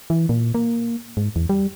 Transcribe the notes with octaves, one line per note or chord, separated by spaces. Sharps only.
E3
A#2
A#3
G#2
E2
G3